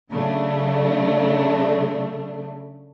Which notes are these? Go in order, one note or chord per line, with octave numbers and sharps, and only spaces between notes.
C#3 F#3 A3 D4